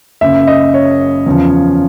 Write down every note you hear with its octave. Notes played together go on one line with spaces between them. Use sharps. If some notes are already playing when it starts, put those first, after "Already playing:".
F#1 F#2 C#3 E5
D#5
C#5
E2 C#3 F3